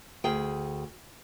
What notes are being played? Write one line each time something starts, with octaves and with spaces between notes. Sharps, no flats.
D2 G#4 G5